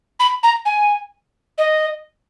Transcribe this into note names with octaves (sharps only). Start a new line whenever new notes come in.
B5
A#5
G#5
D#5